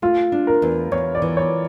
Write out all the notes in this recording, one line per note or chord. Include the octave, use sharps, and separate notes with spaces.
A3 F4
D4
A#4
E2
E2 C#5
D5
E3
C#5